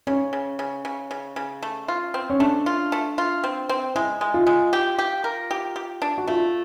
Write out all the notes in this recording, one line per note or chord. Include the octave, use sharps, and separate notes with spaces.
C#3 C#4
C#3
C#3
C#3
C#3
C#3
A3
F4
C4
C#4
A3 D4
F4
A3
F4
C4
C4
G#3 E4
G#3
F4
G#3
G4
G4
A#4
G4
G4
D4
F#4
A3 F4